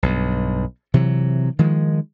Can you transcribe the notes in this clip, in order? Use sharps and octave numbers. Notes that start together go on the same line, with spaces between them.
B1 G2
C3 E3 F#3
D#3 F3 G#3